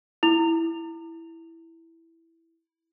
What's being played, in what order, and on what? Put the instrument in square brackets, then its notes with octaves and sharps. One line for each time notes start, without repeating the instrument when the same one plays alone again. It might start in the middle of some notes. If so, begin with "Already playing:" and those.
[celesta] E4 F7